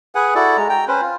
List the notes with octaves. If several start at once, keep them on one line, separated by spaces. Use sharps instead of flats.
G#4 B4 F#5 G#5
E4 F#4 A4 D5
G#3 A#5
G5 A#5
C#4 B4 C5
F4